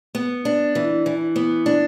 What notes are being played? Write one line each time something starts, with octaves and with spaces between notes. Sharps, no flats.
B3
D4
E3
E3
B3
D4